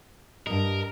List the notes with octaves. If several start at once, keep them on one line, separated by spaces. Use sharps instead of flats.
G2 A#4 D#5